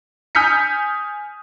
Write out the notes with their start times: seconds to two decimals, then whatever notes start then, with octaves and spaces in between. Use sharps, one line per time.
0.35 G#5 D#6 F6 G6 B6 C#7